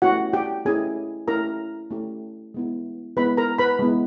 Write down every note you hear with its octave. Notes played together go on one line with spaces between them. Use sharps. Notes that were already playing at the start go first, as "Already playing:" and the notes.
A3 C#4 E4 F#4 G4 F#5
G4 G5
A3 C#4 E4 G4 G#4 G#5
A3 C#4 E4 G4 A#4 A#5
A3 C#4 E4 G4
G#3 B3 E4
G#3 B3 E4 B4 B5
A#4 A#5
B4 B5
G#3 B3 E4